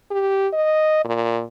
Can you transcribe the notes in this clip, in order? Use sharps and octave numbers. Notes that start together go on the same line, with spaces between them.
G4
D#5
A#2